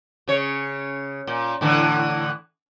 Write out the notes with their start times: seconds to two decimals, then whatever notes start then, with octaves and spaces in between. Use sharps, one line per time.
0.28 C#3 C#5
1.27 A#2
1.61 A2 D3 E3